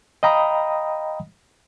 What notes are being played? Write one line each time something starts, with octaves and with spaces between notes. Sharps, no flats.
D#5 F5 G5 A#5 B5 D#6